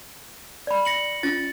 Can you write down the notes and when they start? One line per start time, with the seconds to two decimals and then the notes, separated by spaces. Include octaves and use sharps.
0.67 D5 B5
0.85 A#6 C#7 F#7
1.23 C#4 F4 A6